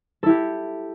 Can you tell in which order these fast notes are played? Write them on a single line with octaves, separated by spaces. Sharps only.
A4 E4 G4